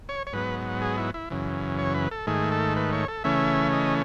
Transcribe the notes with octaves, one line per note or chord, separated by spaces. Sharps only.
C#5
C#5
G#2 F#3 B3 B4
G#4
E4
E4
F#2 C#3 E3
C#5
B4
A4
G#2 D#3 A3 G#4
A4
B4
C#5
A4
C#3 E3 A3 C#4 E5
D#5